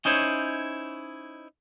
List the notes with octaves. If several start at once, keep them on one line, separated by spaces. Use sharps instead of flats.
C#4 D#4 E4 C5 C#5